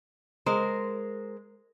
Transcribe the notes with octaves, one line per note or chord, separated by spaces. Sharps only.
G#3 A#4 C5